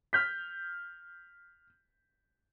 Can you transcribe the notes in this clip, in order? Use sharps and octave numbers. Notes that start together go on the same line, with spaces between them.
F6 G6 B6